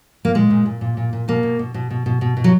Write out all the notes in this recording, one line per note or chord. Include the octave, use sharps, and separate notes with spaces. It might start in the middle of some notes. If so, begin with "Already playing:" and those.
A#3
A#2 G#3
A#2
A#2
A#2
A#2
A#2
B2 A#3
B2
B2
B2
B2
B2
B2
B2
F#3